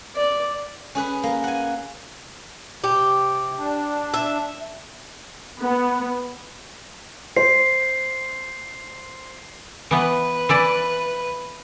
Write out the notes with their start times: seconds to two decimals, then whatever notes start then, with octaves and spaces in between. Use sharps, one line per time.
0.16 D5
0.95 C#4 G#4 B4
1.23 A#3
1.44 F#5 G#5
2.84 C3 G4
3.59 D4
4.14 E5
5.59 B3
7.36 C5 C7
9.91 E3 B3 B4
10.49 E3 E4 D5